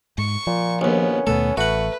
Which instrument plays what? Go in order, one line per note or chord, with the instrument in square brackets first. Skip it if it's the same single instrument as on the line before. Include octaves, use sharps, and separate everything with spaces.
[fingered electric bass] G#2 [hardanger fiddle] C#6
[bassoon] A#2 [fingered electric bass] F3
[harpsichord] A#1 D#2 [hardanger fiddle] B3 [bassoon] C#4
[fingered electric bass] D#2 B2 A3 [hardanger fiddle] B3 [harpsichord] A4
[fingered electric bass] A1 [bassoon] A3 [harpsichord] F#4 F#5 [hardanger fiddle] B4